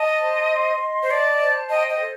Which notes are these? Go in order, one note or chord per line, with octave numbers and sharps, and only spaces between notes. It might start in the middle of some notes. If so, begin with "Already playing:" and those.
Already playing: D#5 A5
C5
C6
D#5
C5
D5 A5
C5
D#5 G5
D#5
A4